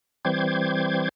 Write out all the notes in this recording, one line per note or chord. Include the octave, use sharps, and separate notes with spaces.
E3 G3 C4 C5 D6 G#6